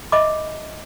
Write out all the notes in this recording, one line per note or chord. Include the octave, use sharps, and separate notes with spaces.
D#5 E5 B5 D6